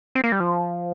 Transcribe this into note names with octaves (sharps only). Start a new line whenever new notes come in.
C4
A#3
G3
F3